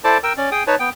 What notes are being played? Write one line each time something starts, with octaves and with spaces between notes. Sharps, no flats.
E4 A4 C5 D5 A5 D6
A#4 G5 E6
C#4 D5
G#4 G5 D#6
D#4 B4 C#5 A5
B3 G5